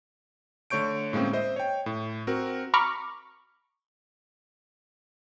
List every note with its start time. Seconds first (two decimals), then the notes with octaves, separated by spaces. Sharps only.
0.70 D3 A3 C#5 C#6 G6 D7
1.13 A2 G#3 A#3 C4 C#4
1.33 C5 D#5 E5
1.56 C#5 G5
1.86 A2
2.27 C4 F#4 A#4
2.74 A#5 B5 C#6 D6 F6